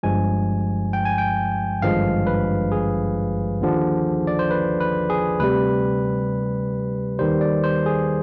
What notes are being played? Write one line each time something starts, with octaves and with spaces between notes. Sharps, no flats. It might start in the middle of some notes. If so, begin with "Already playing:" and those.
G1 G2 F3 G#3 G#5
G5
G#5
G5
G#1 G2 D3 F3 G#3 F5
B4
G#4
D#2 D3 F3
D5
C5
B4
B4
G#4
D2 C3 G3 B4
D#2 D#3 G3 C5
D5
C5
G#4